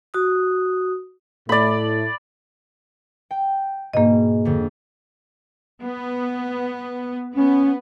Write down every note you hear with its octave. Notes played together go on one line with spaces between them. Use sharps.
F#4 D#6
A2 A3 D5 B5
G5
G#2 B2 A#3 D#5
F2 D3
B3
B3 C#4